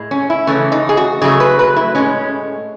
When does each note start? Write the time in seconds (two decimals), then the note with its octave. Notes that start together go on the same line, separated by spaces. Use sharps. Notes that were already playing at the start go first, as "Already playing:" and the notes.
Already playing: A2 G#3
0.11 C#4
0.30 E4
0.47 C#3 E3 A3 C#4
0.72 D#4
0.89 G#4
0.97 F#4
1.21 C#3 F#3 A3 G#4
1.40 B4
1.59 B4
1.76 E4
1.95 A2 G#3 C#4